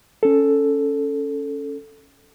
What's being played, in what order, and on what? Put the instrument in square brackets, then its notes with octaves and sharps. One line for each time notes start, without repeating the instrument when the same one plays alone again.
[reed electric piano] C#4 A4